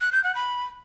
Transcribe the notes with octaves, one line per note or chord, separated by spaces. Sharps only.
F#6
G6
F#5
B5